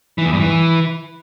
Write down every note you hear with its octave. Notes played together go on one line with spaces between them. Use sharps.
E3
E2
G2
E3